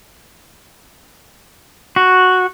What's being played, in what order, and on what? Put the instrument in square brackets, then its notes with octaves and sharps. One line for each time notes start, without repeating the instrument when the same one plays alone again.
[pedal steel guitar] F#4